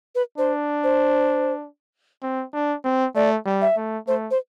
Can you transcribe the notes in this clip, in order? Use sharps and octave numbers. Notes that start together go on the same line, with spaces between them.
B4
D4 C5
C5
C4
D4
C4
A3 D5
G3
E5
A3
A3 C5
C5